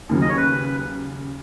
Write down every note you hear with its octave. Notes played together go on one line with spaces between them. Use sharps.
D#2 C#3 F#3
D#5
C#5
B4